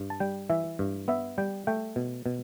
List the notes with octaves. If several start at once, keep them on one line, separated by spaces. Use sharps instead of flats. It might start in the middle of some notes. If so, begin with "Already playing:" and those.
Already playing: G2
A5
G3 G5
E3 E5
G2
B3 E5
G3 G5
A3 G5
B2
B2